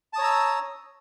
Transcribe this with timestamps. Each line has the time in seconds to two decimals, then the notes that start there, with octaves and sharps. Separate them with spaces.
0.13 A5
0.16 D#6
0.18 C#5
0.21 A#5
0.24 E6